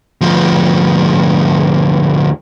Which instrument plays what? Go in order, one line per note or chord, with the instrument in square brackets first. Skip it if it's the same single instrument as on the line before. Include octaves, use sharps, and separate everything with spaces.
[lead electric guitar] D2 F3